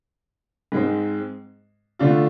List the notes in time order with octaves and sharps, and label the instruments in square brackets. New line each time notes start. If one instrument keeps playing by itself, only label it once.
[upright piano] G#2 G#3 C4
D3 A3 D4 F4